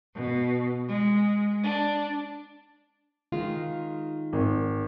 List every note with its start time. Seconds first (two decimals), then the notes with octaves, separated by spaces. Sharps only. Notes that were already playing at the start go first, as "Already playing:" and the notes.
0.14 B2
0.87 G#3
1.63 D4
3.32 D#3 G#3 F4
4.33 G#1